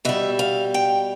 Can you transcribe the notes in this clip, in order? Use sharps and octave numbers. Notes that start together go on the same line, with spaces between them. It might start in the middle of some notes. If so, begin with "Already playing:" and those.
B2 G3 E5
F5
G5